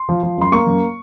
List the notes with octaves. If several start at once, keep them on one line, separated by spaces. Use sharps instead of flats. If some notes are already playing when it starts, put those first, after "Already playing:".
Already playing: C6
F3
F3
F#2 C6
A#3 C#6
F#2